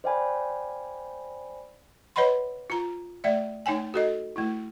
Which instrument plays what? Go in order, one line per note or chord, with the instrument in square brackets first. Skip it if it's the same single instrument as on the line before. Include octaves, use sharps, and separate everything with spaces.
[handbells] C5 D5 F5 G5 G#5 B5
[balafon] B4 C#5 D#5 F#5 B5 C6
F4 A#5
A3 D5 E5
A3 D#4 C#5 G5 G#5
F#4 A4 D#5
A3 E4